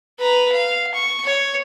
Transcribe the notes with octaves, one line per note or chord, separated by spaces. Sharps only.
B4 A#5
F5
C#6
C#5